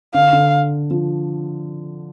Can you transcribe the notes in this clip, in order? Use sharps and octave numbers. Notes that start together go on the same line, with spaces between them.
D3 F5
D3
F3